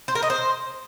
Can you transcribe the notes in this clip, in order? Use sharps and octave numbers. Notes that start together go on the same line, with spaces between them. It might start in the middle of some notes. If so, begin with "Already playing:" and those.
C5
A#4
D#5
C5